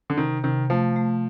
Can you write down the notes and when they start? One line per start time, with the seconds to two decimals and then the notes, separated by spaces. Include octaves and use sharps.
0.10 D3
0.18 C3 D#3
0.44 C3 D#3
0.70 F3 A3
0.96 A3